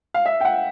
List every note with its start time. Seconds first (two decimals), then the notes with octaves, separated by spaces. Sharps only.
0.14 F5
0.26 E5
0.41 G5
0.45 F#5